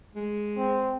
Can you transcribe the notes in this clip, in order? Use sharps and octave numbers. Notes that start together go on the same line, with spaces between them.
G#3
C4